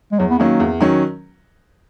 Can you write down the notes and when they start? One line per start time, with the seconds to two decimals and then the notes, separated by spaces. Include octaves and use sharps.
0.12 G#3
0.19 E2 F#3
0.30 B3
0.39 D#3 F#3 A#3 C#4
0.60 E2
0.81 D#3 F#3 C#4